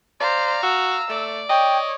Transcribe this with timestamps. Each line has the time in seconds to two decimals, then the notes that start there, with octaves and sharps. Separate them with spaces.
0.21 C5 D5 F5 A#5
0.63 F#4 E6
1.10 A3 D5
1.49 C#5 D#5 G5